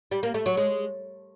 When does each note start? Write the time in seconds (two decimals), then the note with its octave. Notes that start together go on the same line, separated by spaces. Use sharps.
0.11 G3
0.23 A#3
0.34 A3
0.46 F#3
0.57 G#3